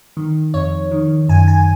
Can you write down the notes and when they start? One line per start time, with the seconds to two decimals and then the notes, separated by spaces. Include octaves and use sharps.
0.17 D#3
0.54 F2 C#5
0.91 D#3
1.29 F#2 G#5
1.48 G#5